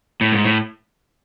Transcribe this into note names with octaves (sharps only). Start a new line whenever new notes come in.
A2
G#2
A2